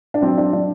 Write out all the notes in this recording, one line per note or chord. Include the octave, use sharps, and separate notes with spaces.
D4
F#3 C4
D4
F#3 D4